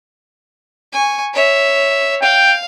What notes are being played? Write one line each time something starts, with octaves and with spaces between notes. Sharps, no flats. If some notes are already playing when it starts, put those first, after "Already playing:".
G#5 C#6
C#5 E5
F5 G5